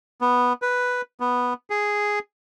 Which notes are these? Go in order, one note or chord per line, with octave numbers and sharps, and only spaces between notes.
B3
B4
B3
G#4